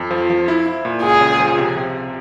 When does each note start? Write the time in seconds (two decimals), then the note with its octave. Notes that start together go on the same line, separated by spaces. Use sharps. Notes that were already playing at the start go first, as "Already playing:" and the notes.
Already playing: F2
0.11 F3
0.30 F3
0.48 E4
0.66 E4
0.85 A#2
1.03 C#2 G#4
1.21 C#3
1.39 F3
1.58 C3
1.77 C3